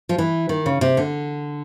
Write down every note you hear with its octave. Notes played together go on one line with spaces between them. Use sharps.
F3
E3
D#3
C#3
C3
D3